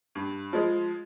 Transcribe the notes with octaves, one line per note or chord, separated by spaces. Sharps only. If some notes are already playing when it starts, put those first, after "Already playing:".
G2
F3 G#3